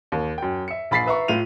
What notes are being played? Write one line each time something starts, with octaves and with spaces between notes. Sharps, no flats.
D#2
F#2 G5
E5 C#7
A#1 B5 A6 B6 C7
B4 E5 A#5 C#6
A2 F4 D#7 F7